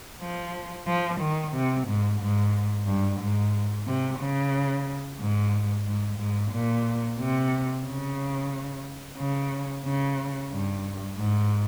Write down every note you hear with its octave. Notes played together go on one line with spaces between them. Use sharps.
F3
F3
D#3
C3
G#2
G#2
G2
G#2
C3
C#3
G#2
G#2
G#2
A#2
C3
C#3
C#3
C#3
G2
G#2